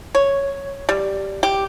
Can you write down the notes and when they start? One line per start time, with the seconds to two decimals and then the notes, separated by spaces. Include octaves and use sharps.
0.15 C#5
0.89 G3
1.43 G4